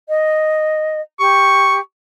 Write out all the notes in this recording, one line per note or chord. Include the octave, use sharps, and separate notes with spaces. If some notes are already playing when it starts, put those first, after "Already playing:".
D#5
G4 C#6